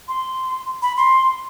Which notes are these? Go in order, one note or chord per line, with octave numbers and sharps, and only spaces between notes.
C6
B5
C6